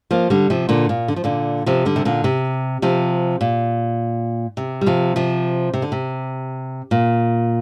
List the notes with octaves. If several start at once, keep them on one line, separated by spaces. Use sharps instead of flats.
F3 A#3
D3 G3
C3 F3
A#2 D3
A#2
D3
F3
A#2 D3
C3 F3
D3 G3
C3
A#2 D3
C3
C3 F3
A#2
C3
G3
C3 F3
C3 F3
C3
D3
C3
A#2